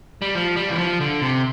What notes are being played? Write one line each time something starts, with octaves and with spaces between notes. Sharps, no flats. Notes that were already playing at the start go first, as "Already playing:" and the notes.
G3
F3
G3
E3
F3
D3
C3